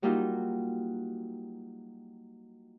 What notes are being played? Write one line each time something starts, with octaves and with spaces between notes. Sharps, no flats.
F#3 G3 A#3 D#4 F4 F#4